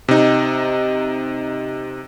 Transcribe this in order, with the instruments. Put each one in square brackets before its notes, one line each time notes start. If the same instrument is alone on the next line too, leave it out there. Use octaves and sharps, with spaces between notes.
[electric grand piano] C3 D#4